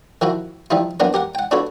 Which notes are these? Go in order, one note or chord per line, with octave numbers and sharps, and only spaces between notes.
D#3 F3 E4 F#4
F3 G3 D#4 E4
F#3 A#3 B3 D4 A#4
G4 A#4 F#5
F#5 G5
D4 F4 F#4 A4 B4 C#5